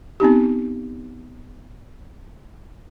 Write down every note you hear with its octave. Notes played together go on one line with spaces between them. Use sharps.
B3 C4 D#4 G4